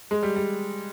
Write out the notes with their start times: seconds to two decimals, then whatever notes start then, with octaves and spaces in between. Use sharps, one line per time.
0.11 G#3
0.23 G3
0.36 G3